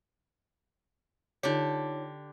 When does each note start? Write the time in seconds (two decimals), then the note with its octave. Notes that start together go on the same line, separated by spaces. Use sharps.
1.43 D3 D#4 F4 G4 C#5